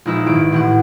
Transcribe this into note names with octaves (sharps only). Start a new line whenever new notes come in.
A#1 G#3 D#4 E4 B4 E5
G#1 D7
A1 A2 F#5